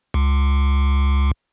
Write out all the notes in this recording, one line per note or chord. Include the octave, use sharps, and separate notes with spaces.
C#2